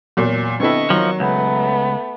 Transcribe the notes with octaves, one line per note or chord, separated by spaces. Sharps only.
E2 A#2 F#3
D3 B3 C4 E4 A4 D#5 C#6
D#3 F3 F#3
C#2 A3 B3